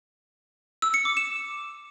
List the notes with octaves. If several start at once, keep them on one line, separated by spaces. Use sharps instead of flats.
E6
C#7
D6
E7